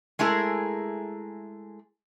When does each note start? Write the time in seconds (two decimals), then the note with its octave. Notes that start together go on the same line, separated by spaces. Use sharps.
0.19 G#3 A3 E4 G#4 A#4